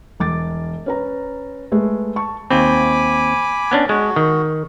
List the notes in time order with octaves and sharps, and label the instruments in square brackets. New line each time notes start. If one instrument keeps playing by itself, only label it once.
[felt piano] E1 D6 A6
C#4 B4 A#5
G#3 A3 A4 B4
A5 C#6
[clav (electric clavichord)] D#2 C4 [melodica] G#5 B5 D6
[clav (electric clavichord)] B3 C#4 D4
[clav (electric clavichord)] G#3 [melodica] F#4
[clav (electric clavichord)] D#3